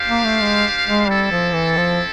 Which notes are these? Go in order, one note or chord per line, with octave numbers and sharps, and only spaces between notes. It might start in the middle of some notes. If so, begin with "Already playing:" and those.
Already playing: D4 G4 C5 F5
A#3
A3
G#3
G#3
G3 C4 E4 A4
F3
E3
F3